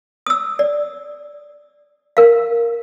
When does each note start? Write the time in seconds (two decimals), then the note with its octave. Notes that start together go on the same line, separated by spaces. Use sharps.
0.26 D#6 E6
0.59 D5
2.17 A#4 F5